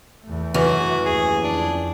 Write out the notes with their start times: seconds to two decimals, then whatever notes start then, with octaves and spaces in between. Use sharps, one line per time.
0.24 E2 A3
0.54 F#2 E3 F#4
1.06 D#2 G#4
1.44 F2 D4